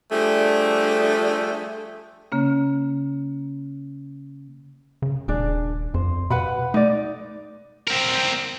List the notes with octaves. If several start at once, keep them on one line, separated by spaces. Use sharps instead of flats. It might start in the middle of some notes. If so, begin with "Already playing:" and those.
F3 G3 A3 D4 G#4
C#3 A#3 C#4
C#3
D#1 D4 G#4
F2 C5
B2 B4 F#5 B5
A3 D#4 D5
C4 A#4